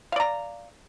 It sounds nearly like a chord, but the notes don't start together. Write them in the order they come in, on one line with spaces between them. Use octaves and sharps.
F5 D5 A#5